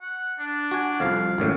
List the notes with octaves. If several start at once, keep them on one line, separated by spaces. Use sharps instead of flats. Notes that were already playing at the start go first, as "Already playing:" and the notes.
F#5
D4
F#4 G#5
C2 F2 F5
G#1 F#2 A2